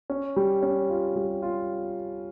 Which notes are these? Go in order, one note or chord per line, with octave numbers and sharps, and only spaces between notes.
C#4
G3
C#4
F4
G3
F4